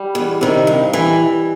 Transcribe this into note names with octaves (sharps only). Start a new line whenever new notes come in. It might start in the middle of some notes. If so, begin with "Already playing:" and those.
Already playing: G3
E2
C3 D#3
G2
E3